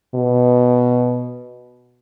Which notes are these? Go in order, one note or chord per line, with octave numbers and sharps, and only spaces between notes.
B2